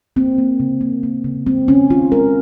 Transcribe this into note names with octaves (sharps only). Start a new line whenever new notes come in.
A#3 C4
A#3
C#3
A#3
A#3
C#3
G#3 C4
G#3 C#4
D#3 F4
G#3 A#4